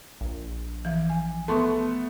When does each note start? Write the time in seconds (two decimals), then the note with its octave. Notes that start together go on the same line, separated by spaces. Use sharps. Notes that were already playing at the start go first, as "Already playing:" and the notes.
0.21 A#1
0.85 E3 F3
1.10 G#5
1.48 A3 B3 A5 C6 C#6